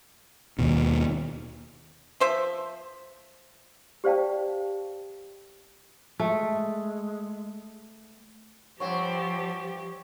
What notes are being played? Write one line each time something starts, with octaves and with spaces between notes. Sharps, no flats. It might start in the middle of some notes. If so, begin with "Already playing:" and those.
D#2 B2
F3 C5 E5
G4 C5 D5 F5 G5 A5
G#3 A3
G2 F3 C4 G4 C#5 F#5